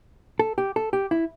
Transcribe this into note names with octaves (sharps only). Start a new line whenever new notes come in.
A4
G4
A4
G4
E4